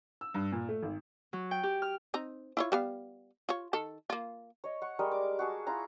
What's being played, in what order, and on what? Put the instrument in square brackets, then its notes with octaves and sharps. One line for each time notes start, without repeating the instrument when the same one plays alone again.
[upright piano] E6
G2
A#2
A3
G#1
[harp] F#3
G5
G4
F6
[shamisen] C4 D#4 A#5
E4 F4 C#5
G3 B3 F5
F4 C#5
D#3 A4
A#3 F4
[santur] C#5 D#5
F#5 C#6
G3 G#3 A#4 D#6
D6
F#4 G#4 A5
E4 F4 G#5 A#5